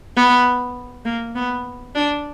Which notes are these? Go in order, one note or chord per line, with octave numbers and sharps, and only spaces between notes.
B3
A#3
B3
D4